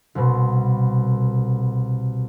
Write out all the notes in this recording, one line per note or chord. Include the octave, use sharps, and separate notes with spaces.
C2 B2